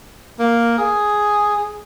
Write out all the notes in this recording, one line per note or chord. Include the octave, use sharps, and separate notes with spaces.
A#3
G#4